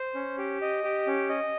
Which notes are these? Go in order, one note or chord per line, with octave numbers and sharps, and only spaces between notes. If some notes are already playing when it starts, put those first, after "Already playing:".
Already playing: C5
C#4
G4
D#5
G4
C#4
D#5